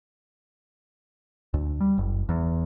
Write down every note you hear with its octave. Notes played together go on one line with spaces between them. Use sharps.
D2
G3
F#1
E2